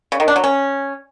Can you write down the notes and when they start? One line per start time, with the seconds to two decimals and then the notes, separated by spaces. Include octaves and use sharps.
0.12 C#3
0.20 D#3
0.28 D4
0.36 F#3
0.44 C#4